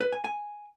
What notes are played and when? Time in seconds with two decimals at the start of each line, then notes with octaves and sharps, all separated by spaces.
0.01 B4
0.12 G#5
0.24 G#5